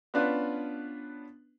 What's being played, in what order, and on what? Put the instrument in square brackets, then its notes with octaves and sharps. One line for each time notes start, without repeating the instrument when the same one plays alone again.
[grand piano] B3 C#4 D4 F4 B4